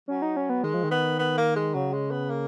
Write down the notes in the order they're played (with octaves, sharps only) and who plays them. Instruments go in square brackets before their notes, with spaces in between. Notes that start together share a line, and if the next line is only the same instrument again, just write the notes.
[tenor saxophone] F#3 [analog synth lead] C#4
[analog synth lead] D#4
C#4
B3
[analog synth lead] D#3 [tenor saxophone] G#3
[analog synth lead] F3
D#3
[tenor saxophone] B3
B3
A#3
G#3
[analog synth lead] C#3 [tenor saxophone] F#3
[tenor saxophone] G#3
B3
A#3